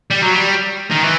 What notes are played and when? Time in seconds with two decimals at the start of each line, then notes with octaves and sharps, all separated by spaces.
0.11 G3
0.22 F#3
0.32 G3
0.91 D#3
1.03 E3